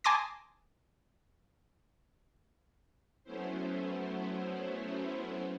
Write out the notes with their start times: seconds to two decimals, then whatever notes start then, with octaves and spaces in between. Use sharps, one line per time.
0.04 G#5 A5 C6 D6 D#6 A#6
3.24 F#3 A3 B3 C#4 E4 C5